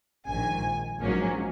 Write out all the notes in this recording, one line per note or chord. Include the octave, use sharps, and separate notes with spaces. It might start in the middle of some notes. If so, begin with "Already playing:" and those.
A#1 G#2 D#3 G#5
A#1 G#2 F#3 A#3 C#4